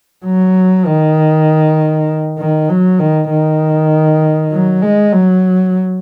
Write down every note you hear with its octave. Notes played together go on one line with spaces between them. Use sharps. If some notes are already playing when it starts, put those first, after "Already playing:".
F#3
D#3
D#3
F#3
D#3
D#3
F#3
G#3
F#3